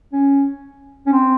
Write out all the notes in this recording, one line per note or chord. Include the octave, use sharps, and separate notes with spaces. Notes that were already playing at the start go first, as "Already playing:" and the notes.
C#4
C#4
C4